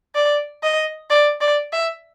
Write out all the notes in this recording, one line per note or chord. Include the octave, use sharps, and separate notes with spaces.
D5
D#5
D5
D5
E5